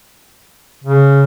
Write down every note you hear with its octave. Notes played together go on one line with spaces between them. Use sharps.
C#3